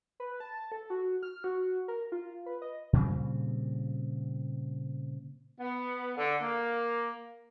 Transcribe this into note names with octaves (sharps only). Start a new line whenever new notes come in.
B4
A5
A4
F#4
F6
F#4
A#4
F4
B4
D#5
A#2 C#3 G3 C4
B3
D3
A#3